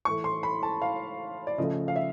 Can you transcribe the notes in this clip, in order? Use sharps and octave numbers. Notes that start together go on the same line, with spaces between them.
A2 E3 A3 C#6
C6
B5
A5
F5
D5
C#3 F3 A3 D#5
F5
E5